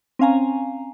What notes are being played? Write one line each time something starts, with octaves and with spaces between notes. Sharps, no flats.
C4 C#4 F5 G#5 A#5